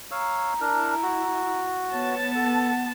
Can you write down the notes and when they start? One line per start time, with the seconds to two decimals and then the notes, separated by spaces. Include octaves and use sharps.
0.11 C#5 F5 A#5 E6
0.61 D4 E4 A#4
1.03 F#4
1.92 B3 C#5 A5
2.35 A4 F#5